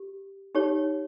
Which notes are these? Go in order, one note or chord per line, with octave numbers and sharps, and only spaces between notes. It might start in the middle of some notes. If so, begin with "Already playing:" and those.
Already playing: G4
D#4 G4 C#5